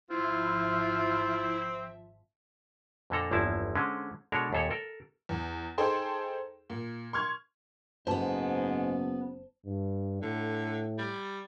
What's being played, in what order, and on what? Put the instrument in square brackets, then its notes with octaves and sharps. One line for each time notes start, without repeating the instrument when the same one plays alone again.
[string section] G#1 F3 E5 [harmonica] C4 [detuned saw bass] E4 [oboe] F4
[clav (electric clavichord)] F2 A#2 D3 A#3 A4 A#5
G1 E2 F3 A#3 E4 A5
D3 G#3 C4 C#4
B2 G#3 D4 A4 A#4 C#5
D#2 A#2 A4 C#5
A4 A#4
[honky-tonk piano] E2
D#4 G#4 A4 C5 G5 C6
A#2
C6 C#6 F6 G#6
[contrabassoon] F#1 [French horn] G#2 [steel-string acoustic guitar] B3 B4 [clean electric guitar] C5 A5
[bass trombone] G2
[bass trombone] A2 [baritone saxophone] D3
[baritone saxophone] G3